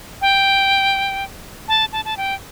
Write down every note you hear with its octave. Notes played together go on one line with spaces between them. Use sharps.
G5
A5
A5
A5
G5